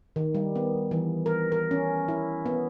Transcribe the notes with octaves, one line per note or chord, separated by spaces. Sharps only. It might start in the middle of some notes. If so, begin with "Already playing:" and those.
D#3
G3
B3
E3
A#4
A#4
C#4
E4
B3